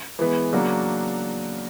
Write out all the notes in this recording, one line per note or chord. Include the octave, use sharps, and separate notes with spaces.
E3 G#3 B3
C#3 F#3 A#3 D4 F#4